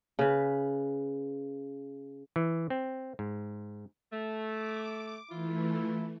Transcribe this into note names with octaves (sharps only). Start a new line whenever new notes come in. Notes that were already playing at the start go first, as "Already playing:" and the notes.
C#3 B4
E3
C4
G#2
A3
D6
E3 A3 E4 F4